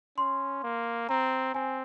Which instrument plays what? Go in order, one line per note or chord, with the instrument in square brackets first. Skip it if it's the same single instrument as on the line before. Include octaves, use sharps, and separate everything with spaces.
[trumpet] C#4 [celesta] C6
[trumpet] A#3
[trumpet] C4 [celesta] A#5
[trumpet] C4 [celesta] G#5